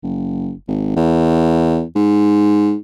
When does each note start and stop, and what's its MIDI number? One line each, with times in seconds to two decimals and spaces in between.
0.03 0.52 30
0.68 0.95 32
0.96 1.83 40
1.96 2.75 44